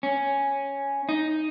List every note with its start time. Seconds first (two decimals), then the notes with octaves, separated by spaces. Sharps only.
0.03 C#4
1.09 D#4